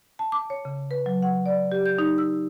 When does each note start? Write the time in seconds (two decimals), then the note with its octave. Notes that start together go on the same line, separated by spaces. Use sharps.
0.19 A5
0.32 D6
0.50 C#5
0.65 C#3
0.91 B4
1.06 F#3
1.22 F#5
1.46 D5
1.72 G4
1.86 G6
1.99 D#4
2.18 E6